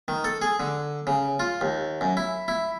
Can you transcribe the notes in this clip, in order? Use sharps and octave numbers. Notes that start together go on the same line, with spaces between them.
D#3
A4
G#4
D3
C#3
F4
D#2
F#2
E4
E4